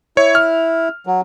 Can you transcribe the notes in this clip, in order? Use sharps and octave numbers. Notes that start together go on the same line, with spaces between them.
E4 C#5
F6
F#3